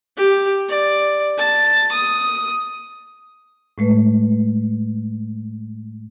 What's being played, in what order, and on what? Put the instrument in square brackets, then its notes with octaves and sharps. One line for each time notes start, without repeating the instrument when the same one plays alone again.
[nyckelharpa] G4
D5
A5
D#6
[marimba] A2 G#3 A3 B4